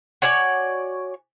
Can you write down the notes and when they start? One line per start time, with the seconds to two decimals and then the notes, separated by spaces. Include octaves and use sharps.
0.22 F#4 C#5 D5 G#5